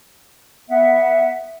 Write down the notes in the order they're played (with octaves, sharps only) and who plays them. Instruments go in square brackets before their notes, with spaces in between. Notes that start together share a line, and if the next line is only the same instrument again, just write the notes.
[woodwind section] B3 F#5 [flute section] E5